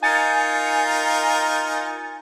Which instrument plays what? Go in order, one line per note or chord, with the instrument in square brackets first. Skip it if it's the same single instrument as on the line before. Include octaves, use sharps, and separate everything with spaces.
[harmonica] D#4 F4 A#4 [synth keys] G#5 A6 C#7